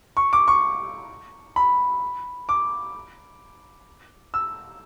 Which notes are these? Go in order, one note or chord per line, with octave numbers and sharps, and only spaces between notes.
C#6
D6
C#6
B5
D6
E6